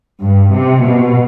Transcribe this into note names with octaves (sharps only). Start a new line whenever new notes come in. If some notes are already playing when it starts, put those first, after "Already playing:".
G2
C3
B2